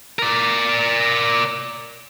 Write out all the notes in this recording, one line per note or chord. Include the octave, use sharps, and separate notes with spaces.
A#4 D5